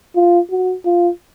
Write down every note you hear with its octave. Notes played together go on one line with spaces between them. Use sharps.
F4
F#4
F4